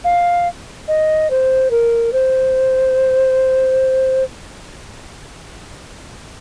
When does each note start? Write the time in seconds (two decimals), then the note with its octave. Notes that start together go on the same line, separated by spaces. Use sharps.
0.04 F5
0.88 D#5
1.30 C5
1.71 A#4
2.13 C5